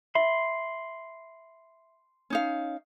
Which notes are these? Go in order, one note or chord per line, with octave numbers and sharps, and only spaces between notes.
E5 B5 C6
C#4 D#4 F5